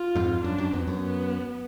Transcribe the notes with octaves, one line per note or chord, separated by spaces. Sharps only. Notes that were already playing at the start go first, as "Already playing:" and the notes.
Already playing: F4
F2 G#2
F#2 D4
F#2
F2 B3
F#2
B3